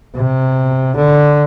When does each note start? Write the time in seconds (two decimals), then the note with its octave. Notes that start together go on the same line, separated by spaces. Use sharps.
0.16 C3
0.96 D3